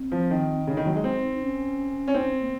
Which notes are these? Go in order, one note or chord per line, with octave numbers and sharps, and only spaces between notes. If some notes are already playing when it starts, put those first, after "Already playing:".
Already playing: C4
F3
D#3
C#3 D#4
D#3
F#3
G#3
C4
C#4
C#4
C4 D#4
C#4
A#3